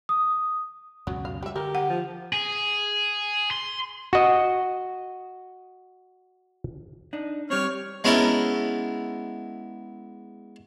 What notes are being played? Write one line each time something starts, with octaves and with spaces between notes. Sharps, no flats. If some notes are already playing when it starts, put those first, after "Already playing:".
D#6
C#2 F#2 B2 F#3
F5
G3 G4 E5
D3 G4 A#4
F#5
F3
G#4
C6
F#4 D#5
D4 D#4
G3 C4 C#5 F6
G#3 B3 C#4 E4 A4 A#4